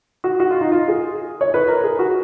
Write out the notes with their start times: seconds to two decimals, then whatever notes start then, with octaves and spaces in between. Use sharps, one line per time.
0.24 F#4
0.40 F#4
0.50 F4
0.61 D#4
0.72 F4
0.88 G#4
1.41 C#5
1.54 B4
1.68 A#4
1.84 G#4
1.99 F#4